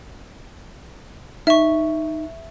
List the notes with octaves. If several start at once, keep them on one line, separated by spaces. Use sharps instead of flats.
D#4 E5 C#6